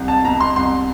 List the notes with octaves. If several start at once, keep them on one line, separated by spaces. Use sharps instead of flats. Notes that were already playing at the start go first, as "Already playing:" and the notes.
Already playing: C2
A5
B2 A#5
C6
C2 C6